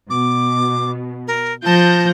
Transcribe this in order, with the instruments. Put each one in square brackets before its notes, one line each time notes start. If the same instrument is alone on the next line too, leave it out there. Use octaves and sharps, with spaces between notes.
[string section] B2 [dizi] D6
[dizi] A#4
[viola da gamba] F3 [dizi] A5 [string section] G6 A#6